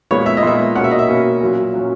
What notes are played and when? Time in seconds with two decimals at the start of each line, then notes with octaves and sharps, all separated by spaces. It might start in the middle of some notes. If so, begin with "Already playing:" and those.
0.11 A#2 G#3 B3 C#5
0.26 E5
0.37 D#5
0.43 A#2 G#3 B3 E5
0.75 B2 A#3 C#4 F#5
0.84 E5
0.91 D#5
0.99 E5
1.09 B2 A#3 C#4
1.41 A#2 F#3 C#4
1.74 A#2 F#3 C#4